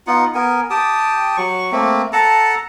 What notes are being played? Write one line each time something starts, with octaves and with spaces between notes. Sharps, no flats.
B3 D#4 F4 F#5
B3 A#4 G#5
G4 G5 A5 D#6
F#3 C#6
A3 A#3 C4
A4 F#5 A5 A#5